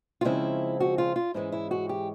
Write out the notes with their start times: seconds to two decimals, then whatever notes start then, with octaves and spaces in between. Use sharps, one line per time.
0.21 F4
0.25 C#3 F3 G#3 C4 E4
0.80 F#4
0.98 F4
1.16 F4
1.34 G#2 E3 G#3 C#4 E4
1.52 E4
1.71 F#4
1.89 G4